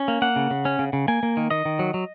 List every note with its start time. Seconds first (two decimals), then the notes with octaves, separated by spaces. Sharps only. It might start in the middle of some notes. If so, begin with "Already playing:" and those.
Already playing: C#4
0.08 A#3
0.22 A#3 F#5
0.36 C#3
0.51 C#3
0.65 C#4
0.79 C#3
0.93 C#3
1.08 A#3 G#5
1.23 A#3
1.37 D#3
1.51 D#3 D#5
1.65 D#3
1.79 F#3
1.94 F#3